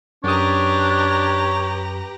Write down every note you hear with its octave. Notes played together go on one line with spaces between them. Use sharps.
F#2 D4 G4 B4 C#5 A#5 D#6